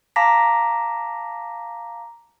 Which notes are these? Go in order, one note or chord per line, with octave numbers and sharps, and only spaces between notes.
F5 A5 A#5 D6 A#6 B6